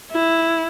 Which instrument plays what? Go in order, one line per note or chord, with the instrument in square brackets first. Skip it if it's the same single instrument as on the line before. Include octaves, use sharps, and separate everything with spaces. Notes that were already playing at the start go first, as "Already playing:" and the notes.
[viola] E4